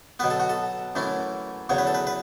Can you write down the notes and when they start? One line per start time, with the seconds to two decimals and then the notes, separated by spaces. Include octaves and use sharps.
0.19 B2 F#3 B3 B4
0.30 A4
0.40 F#4
0.49 A4
0.95 F#2 E3 A3 C#4
1.69 E2 C#3 F#3 C#5
1.78 B4
1.87 A4
1.94 B4
2.07 B4